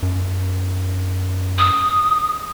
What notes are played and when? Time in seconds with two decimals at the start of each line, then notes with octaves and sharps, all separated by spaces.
0.03 F#2
1.58 D#6